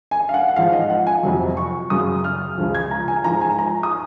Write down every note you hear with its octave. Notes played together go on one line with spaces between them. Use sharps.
G#5
F5
F#5
F#5
G#2 F3 F5
D#5
F#5
G#5
F2 C3 F#3
C#6
F#2 C#3 F#3 D#6
F6
C#2 C#3 F3
G#6
A#5
G#5
G#2 F3 A#5
G#5
A#5
D#6